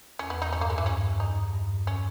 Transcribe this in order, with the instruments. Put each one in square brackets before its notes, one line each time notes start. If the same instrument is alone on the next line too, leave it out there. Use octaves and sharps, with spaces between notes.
[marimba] E2 [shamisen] C#4
[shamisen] B3
D#4
[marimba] G2 [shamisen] C#4
[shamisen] A#3
[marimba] G#2 [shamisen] G#3
[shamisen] E3
[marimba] G2 [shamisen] C#4
[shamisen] D#4
[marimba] G2
[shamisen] C#4